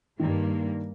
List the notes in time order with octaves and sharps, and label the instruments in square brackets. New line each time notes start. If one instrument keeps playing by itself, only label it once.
[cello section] G2 A#3 [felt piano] D#3